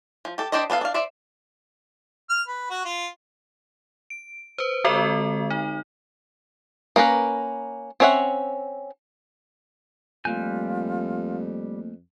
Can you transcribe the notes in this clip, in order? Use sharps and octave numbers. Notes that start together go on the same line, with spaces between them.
F3
G4 A4
D4 G4 C5 D5 D#5
B3 D4 A4 F5
D4 F5
C5 D5 E5
F6
B4
F#4
F4
D7
B4 C5
D3 G#3 C4 F#4 A4 D#5
D#4
A#3 C#4 A#4 B4
C4 C#4 C#5 E5 F#5
F2 G3 A3 A#3 F4 G#5 F#6 G6